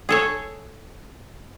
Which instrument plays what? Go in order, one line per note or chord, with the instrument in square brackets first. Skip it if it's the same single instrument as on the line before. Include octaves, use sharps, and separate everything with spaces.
[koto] G#4 A4 C#5